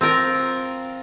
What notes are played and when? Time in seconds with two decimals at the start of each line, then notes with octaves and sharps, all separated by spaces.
0.01 C4 F4 A#4